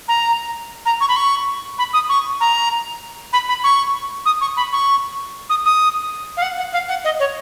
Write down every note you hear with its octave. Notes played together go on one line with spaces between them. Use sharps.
A#5
A#5
C#6
B5
C#6
B5
D#6
C#6
A#5
B5
B5
C#6
D#6
C#6
B5
C#6
D#6
D#6
F5
F#5
F#5
F5
F#5
D#5
C#5